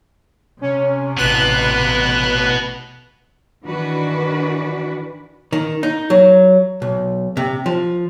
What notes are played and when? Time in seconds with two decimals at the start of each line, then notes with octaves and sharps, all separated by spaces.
0.61 C3 C#4
1.17 A1 B2 B3 B4 F#6
3.65 D#3 E3 D4 F#4 B4 D5
5.52 D#3
5.83 D#4
6.10 F#3
6.82 B1
7.37 C3
7.66 F3